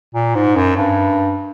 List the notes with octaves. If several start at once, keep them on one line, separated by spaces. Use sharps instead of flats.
A#2
G#2
F#2
G2